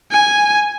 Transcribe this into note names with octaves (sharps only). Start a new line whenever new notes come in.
G#5